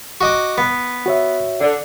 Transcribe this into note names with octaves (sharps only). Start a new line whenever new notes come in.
F#4 D#5 D6
B3
F#4 C#5 E5
D3 D5